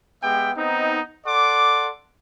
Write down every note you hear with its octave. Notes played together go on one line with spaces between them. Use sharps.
G#3 B3 G4 E5 G5
B3 C4 D#4
A4 D5 F#5 C6 D6